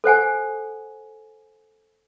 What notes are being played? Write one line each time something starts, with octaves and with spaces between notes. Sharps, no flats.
A4 C5 F#5 G#5